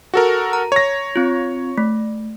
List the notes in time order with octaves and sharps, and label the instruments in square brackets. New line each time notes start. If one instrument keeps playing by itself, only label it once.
[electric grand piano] F#4 A4 A#4
[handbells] A#5
[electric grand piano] C#5 A#6
[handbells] C4 F4
A3